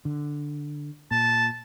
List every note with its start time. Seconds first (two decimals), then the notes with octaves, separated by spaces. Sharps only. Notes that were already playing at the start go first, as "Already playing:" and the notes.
0.05 D3
1.11 A#2 A5